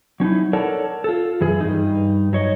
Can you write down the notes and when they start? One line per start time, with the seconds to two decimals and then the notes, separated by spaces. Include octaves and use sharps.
0.20 F#3 C#4 D#4 E4
0.53 A4 A#4 C#5 D5 F#5 A5
1.04 F4 A4
1.41 F#2 E3 G#4
1.61 G2 D#4
2.33 F#3 C#5 D#5